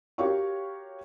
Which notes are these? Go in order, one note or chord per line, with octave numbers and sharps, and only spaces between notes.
F#4 G4 A#4 C#5 F5 C#6